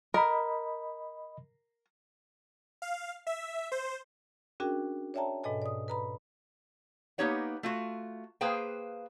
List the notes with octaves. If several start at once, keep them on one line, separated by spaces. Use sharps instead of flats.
A#4 D#5 B5
F5
E5
C5
C#4 D4 F#4 G#4 A#4 G5
C#5 D5 E5 G5 A5 A#5
G#2 B2 A4 D#5 G#5
D5 D#6
B4 A#5 B5
A#3 B3 D#4 G4 C#5 F#5
A3 F4 F#4
A#3 G#4 B4 C5 F5 G5